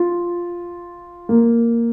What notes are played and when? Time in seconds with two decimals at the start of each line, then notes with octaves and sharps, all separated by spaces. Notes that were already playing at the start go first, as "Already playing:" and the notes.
Already playing: F4
1.29 A#3